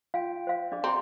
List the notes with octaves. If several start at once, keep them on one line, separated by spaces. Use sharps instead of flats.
F4 F5 G5
C5 F5
D4 G#4 D5
C4 F#4 G#4 G5 A#5